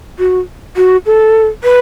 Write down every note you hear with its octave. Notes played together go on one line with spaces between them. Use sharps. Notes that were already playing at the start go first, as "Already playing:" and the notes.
F#4
F#4
A4
B4